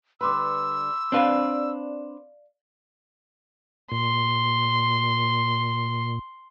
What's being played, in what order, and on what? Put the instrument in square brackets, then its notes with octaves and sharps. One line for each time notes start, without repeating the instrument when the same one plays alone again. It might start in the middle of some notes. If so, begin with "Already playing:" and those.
[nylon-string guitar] D3 G3 B4 [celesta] B5 C6 D6 [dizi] E6
[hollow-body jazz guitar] C4 D4 B4 [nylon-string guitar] D5 F5
[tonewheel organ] A#2 [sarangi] C6